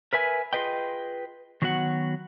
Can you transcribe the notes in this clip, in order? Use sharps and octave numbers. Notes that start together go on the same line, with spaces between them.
A#4 B4 E5 G#5
F4 G#4 B4 D#5 G5
D#3 F#3 B3 F#4 F#5